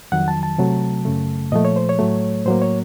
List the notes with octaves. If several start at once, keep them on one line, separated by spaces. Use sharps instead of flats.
F2 D#3 F#3 F#5
A5
A5
C3 F#3 A3
F#2 C#3 A3
A#2 F3 A3 D#5
C#5
C5
C#5
A2 F#3 A3
A2 F#3 A#3 C5
C#5